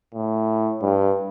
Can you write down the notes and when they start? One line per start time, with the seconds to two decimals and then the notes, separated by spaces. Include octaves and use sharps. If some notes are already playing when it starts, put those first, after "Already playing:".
0.15 A2
0.82 G2